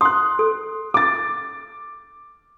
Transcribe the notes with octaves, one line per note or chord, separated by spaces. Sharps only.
C6 D#6 F#6
A4
D6 A6